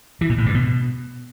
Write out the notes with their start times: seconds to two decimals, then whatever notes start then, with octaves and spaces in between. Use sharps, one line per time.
0.21 E3
0.29 A#2
0.38 A2
0.46 G2
0.55 B2